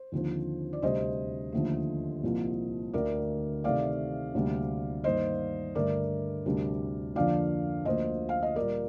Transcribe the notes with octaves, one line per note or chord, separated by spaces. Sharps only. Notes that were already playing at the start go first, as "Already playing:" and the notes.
Already playing: C5
D#2 D3 F3 C4 D#4
D5
D2 C3 G3 D4 C5 D#5
D#2 D3 F3 A3
C2 A#2 F3 A#3
D2 D3 A3 A#4 D5
C3 D#3 A3 C4 D5 F5
D2 C3 G3 A#3 D4
G2 D#3 A#3 C5 D#5
G2 D3 A3 D4 A#4 D5
D2 C3 G3 D4
F2 D3 F3 A#3 D4 D5 F5
D2 D3 F3 A#3 D4 C5 D#5
F5
D#5
A#2 G3 A#3 A#4 D5